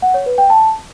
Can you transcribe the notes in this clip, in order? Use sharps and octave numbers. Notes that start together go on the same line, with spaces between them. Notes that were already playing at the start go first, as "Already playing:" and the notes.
F#5
C#5
B4
G5
A5